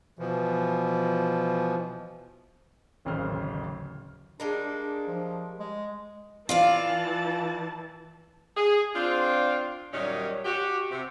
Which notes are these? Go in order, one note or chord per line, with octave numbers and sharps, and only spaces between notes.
B2 E3 F3
D1 A1 D#2 C#3 C5 F6
G3 G#3 A#3 D4
D4
F3
G#3
E3 F4 D5 F5 A5
G#4
C4 D4 F4
F#2 A#2 D#3 G3 C#4 D#4
F#4 G4
C3